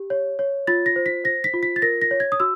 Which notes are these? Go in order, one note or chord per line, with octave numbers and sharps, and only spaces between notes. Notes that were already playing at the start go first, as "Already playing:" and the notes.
Already playing: G4
C#5
C#5
F4 A6
A#6
C5
B6
C5 A#6
B6
F4
B6
A6
A#4 A#6
A#6
C#5
G#6
D#6
F#4 E6